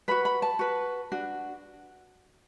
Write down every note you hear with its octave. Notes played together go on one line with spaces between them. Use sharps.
F#4 B4 B5
B5
A5
F#4 B4
D4 F#4